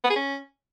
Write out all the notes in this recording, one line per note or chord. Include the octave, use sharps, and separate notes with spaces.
B3
G#4
C#4